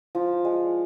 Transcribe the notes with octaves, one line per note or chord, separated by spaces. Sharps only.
F3
G#3